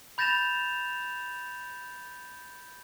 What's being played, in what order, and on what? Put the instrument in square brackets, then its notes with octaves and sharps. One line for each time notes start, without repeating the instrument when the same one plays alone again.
[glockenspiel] B5 G6 A6 A#6 E7 F7